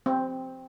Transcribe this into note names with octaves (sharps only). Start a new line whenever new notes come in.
C4